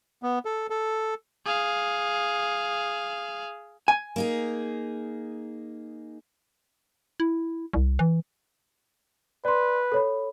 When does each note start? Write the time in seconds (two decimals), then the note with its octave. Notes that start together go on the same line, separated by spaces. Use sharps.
0.23 B3
0.45 A4
0.70 A4
1.46 G#4 F5
3.88 G#5
4.16 A#3 D#4 G#4
7.20 E4
7.73 C2
7.99 E3
9.45 B4 D5 C6
9.92 A4 C#5 B5